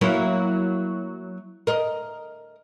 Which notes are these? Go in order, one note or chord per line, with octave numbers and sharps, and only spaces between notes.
F#3 A#3 E4
A#4 D#5